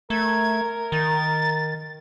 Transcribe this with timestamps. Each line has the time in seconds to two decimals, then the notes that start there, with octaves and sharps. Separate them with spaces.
0.10 A3 A#4 G#6
0.92 D#3 A6